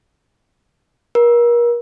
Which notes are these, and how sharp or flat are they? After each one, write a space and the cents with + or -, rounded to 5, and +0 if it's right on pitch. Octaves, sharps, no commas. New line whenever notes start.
A#4 +35